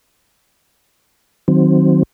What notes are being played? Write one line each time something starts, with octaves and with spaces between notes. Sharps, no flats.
D#3 F#3 C4